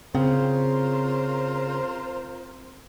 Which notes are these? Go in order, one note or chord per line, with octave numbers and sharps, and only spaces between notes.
C#3 C4 F4 A#4 C5